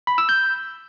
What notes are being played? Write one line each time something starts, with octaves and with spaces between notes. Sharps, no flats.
B5
E6
G6